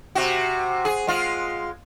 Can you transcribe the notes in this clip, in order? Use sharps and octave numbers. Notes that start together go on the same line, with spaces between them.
C3 F#4
G#4
G#3 F4